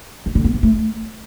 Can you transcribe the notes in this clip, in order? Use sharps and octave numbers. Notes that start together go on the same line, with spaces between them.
D#3
D3
B3
E3
A3